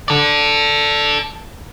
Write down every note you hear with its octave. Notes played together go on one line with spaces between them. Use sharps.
A4 D5